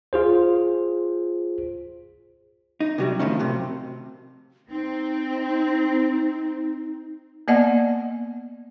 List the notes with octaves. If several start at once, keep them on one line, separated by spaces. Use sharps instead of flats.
F4 G#4 C5
D#4
C3 F#3 G3
A2 D#3 F3 C#4
F#2 A2 C3
C4 D#4
A#3 B3 D5 D#5 F#5 A5